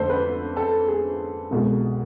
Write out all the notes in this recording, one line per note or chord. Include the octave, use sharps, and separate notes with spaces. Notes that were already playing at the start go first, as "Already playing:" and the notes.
Already playing: F2 D3 A3 A4 C5
B4
A4
G#4
C2 B2 G#3